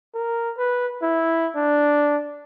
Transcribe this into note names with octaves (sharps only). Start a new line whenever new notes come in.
A#4
B4
E4
D4